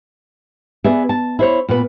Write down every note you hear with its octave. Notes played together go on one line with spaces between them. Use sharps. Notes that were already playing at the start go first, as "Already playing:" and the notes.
B3 G#4 D5 E5
A5
E4 C5 C#5
A#2 B3 B4